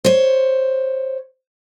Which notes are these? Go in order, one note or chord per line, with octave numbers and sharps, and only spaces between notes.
C5 C#5